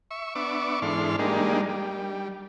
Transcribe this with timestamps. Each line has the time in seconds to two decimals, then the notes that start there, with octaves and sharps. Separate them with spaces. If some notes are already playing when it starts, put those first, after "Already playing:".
0.11 E5 C#6
0.35 B3 D4 E5 C#6 D6
0.82 G#2 E3 D4 A4 C6 F6
1.19 G3 G#3 A#3 D4 D#4
1.69 G3